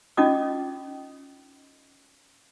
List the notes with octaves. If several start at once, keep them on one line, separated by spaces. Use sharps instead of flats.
C#4 D#4 F4 D#5 D6 D#6